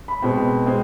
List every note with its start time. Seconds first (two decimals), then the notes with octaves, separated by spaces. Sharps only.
0.08 B5
0.22 B2 G#3 C4
0.66 G#3 C4